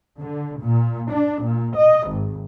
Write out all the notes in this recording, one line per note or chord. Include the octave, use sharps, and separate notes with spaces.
D3
A#2
D4
A#2
D#5
G#1